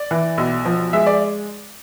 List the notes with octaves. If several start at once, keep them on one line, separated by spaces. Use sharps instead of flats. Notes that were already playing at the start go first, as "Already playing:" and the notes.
Already playing: D5
E3
B1
F3
G#3 E5
D5